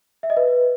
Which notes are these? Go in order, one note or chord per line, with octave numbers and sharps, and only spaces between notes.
E5
D#5
B4